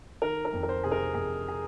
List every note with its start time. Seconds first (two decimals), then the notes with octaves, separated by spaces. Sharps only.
0.22 D#3 A#4
0.45 A#4
0.53 F2
0.63 A#4
0.69 C5
0.84 C3 G#4
0.92 A#4
1.14 F2 G#4
1.48 G#4